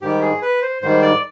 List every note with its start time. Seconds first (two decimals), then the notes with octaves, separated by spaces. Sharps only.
0.02 G#2 D#3 G3 G4
0.21 G#4
0.42 B4
0.62 C5
0.82 G#2 D#3 G3 C5
1.02 D5